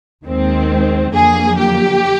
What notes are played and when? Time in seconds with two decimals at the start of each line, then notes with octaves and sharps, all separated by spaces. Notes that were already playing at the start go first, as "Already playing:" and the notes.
0.24 D#2 D#3 G#3 C4
1.14 F2 D3 F#3 A#3 G#4
1.59 G4